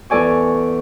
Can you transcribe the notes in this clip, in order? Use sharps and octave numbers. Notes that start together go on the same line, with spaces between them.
E2 A4 D5 G#5 C#6